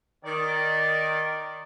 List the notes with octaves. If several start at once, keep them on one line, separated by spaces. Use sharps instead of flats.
D#3 D5